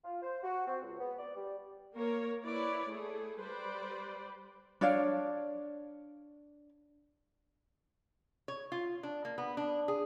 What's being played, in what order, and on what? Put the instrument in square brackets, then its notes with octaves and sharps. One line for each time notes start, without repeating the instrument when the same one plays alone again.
[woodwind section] F4
C5
F#4
C4
C#2
B3
D5
G3
[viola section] A#3 A#4 C#5
E4 B4 C#5 D5
A3 G#4 A4
G3 B4 C5 D5
[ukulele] D4 C#5 D5 F5
[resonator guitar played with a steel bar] C#5
F4
D4
A#3
B3
D4
G#4